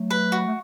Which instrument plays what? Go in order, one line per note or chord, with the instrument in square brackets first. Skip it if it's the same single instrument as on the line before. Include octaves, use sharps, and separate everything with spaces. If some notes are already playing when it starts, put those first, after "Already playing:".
Already playing: [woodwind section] F#3 A3
[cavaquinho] B4
F#4
[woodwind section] A3